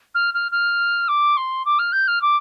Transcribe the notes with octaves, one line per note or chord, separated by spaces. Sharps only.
F6
F6
F6
D6
C6
D6
F6
G6
F6
D6